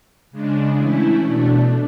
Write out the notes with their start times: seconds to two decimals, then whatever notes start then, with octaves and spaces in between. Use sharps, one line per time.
0.31 C#3 G#3 D4
0.76 E3 A3 C#4 E4
1.22 B2 A3 D4